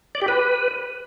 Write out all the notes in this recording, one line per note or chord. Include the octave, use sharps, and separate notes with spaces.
D5
G4
B4